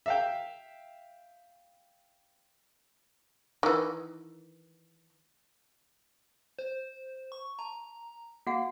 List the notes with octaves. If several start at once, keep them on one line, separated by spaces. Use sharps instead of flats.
E5 F5 G5
D#3 E3
C5
C#6
A5 A#5
A#3 F#4 F5 F#5